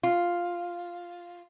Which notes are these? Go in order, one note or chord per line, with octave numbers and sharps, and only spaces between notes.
F4